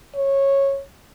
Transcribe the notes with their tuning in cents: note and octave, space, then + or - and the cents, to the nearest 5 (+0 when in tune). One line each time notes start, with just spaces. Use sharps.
C#5 -15